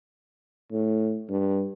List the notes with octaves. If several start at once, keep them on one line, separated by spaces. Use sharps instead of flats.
A2
G2